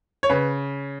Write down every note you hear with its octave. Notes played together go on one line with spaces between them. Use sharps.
C#5
C#3 B4